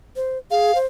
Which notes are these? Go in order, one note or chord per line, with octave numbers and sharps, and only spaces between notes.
C5
G#4 F5
C5